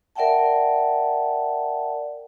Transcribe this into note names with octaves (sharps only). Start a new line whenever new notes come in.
A#4 D5 E5 F#5 G5 A5